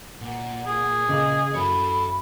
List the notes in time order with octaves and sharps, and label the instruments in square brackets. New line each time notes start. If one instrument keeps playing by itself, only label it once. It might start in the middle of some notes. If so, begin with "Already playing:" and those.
[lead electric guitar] A#2 [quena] F#5
[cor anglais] G#4
[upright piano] C#3 D6 [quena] D#5
[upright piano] F#2 [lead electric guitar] A4 C#5 [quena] B5